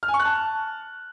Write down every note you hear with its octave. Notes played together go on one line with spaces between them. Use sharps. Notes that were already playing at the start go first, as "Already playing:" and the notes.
F6
G#5
C#6
F#6
A5